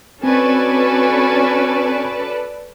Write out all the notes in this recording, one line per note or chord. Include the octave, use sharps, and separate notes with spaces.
C4 C#4 F#4 A4 B4 D5 G#5 C#6